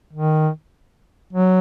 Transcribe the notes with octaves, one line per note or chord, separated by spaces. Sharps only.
D#3
F#3